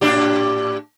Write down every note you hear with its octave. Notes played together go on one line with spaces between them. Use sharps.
A2 D4 G4